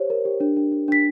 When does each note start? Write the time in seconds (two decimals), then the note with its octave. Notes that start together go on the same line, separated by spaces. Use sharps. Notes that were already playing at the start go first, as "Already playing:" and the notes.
Already playing: G4 C5 C#5
0.10 A#4
0.25 G4
0.40 D4
0.57 D4
0.72 D4
0.88 D4 B6